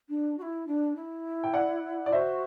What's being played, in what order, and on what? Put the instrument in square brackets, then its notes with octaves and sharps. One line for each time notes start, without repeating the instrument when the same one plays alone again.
[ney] D4
F#4
E4
D4
E4
[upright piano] G5
D5 F#5
D5
[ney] F#4 [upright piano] C5 E5